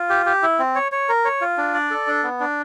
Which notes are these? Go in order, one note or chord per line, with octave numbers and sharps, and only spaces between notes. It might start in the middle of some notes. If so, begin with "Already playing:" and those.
Already playing: F4
G4
G4
E4
C4
C#5
C#5
A#4
C#5
F4
D4
D5
A4
D4
B3
D4